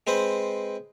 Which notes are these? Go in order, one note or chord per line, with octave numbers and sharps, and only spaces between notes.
G#3 C4 B4 C5